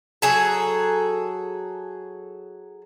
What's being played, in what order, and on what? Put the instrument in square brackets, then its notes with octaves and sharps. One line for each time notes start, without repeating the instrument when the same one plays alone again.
[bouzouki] F#3 G#4 A4